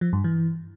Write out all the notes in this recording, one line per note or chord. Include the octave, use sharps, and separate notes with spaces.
F3
G2
E3